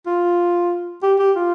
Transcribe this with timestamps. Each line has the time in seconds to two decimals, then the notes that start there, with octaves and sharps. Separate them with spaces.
0.06 F4
1.03 G4
1.19 G4
1.36 F4